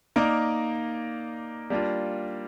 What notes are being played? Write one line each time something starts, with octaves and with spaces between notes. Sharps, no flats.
A#3 D#4 A#4 D5
G3 A#3 D4 F4